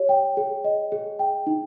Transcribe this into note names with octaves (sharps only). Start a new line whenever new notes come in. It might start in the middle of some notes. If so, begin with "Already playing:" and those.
Already playing: G4 C#5
G5
G#4
D#5
G#4
G5
D#4